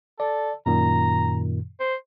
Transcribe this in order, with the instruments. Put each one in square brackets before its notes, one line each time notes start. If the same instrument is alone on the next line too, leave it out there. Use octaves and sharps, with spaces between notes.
[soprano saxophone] A4 [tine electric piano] D5
[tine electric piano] F#2 A#2 D#3 [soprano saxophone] A#5
[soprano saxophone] C5